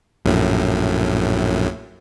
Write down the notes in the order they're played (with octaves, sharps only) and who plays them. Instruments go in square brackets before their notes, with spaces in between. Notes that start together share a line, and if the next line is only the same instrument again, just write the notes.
[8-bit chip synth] A#1 F#2 A2